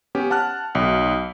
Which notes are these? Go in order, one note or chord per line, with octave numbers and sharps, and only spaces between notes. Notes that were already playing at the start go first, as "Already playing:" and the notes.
B3 C#4 G4
F#5 A5 F6 F#6
B1